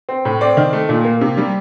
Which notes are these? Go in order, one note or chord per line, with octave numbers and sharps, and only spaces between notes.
C4
A2
C4 D5
D#3
A3
A#2
A#3
C3
G3